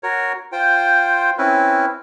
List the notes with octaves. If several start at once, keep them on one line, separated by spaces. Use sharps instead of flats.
F#4 A#4 C#5
F4 C5 G5
C4 C#4 E4 B4